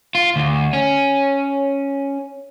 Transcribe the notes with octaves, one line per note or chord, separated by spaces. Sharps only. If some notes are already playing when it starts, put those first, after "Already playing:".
F4
D2
C#4